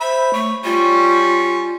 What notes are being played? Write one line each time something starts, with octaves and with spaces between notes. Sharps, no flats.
C5 E5 B5
A3 C#5
G3 C#4 F4 C#6